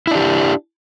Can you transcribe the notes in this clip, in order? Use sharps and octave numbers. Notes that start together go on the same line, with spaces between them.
D4 E4 G4